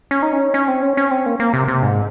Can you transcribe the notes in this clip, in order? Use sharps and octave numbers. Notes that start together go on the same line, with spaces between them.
C#4
D#4
C#4
C#4
C4
C#4
C#4
C4
A#3
A#3
C3
C3
G#2